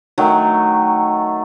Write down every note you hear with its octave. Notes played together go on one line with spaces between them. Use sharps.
D#3 F#3 A3